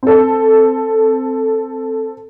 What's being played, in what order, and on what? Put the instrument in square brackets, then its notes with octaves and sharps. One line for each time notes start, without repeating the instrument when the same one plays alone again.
[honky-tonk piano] C4 A4